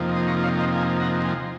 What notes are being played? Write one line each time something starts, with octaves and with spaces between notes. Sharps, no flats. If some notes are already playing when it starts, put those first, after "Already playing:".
Already playing: F2 C3 F3 A#3 D#4
C6 D#6
A#5 C#6
C#5 F5
C5 D#5
F5 G#5
F#5 A#5
G#5 C6